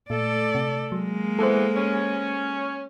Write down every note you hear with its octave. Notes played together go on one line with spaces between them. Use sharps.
A#2 A3 A4 D5
C3
F#3 G#3 A#3
E3 B3 A4 C5
C#4